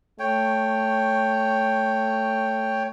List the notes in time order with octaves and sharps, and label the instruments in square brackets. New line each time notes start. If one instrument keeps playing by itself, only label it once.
[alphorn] A3 [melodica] C#5 G5